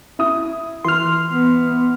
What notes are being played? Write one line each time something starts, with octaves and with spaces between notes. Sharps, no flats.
E4 D#6
E3 C6 F6
B3